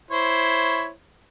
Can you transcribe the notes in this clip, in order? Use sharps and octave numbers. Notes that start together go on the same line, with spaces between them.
E4 C5 C#5